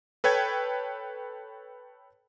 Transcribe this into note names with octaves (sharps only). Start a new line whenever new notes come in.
A4 B4 C#5 G5 G#6